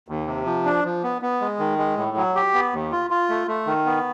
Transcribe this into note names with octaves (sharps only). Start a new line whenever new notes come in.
D#2
C3
F3
D4
F3
B3
B3
G#3
D#3
G#3
A2
F#3
G4
B3
D#2
F4
F4
A3
A3
D#3
B3